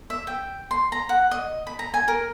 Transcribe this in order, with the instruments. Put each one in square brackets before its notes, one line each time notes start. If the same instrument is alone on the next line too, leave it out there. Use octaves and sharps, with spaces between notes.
[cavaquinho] E5
G5
C6
A#5
F#5
D#5
B5
A#5
G#5
A#4